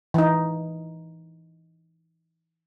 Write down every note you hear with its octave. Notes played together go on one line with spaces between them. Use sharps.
E3 D#4